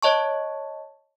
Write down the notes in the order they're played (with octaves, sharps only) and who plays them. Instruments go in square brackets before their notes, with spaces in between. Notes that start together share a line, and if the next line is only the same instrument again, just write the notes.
[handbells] C#5 D#5 A5 C#6